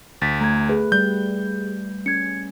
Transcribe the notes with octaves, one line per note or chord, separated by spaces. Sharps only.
D2 A6 B6
A3 A#5 G#6
G#4 B4
G3 G6
C#4 G#6 C#7